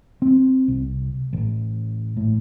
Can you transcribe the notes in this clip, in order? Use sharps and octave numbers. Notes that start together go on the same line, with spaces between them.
C4
C2
A1
A2